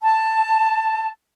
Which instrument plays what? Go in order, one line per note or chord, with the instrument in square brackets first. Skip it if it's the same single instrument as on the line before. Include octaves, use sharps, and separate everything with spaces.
[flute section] A5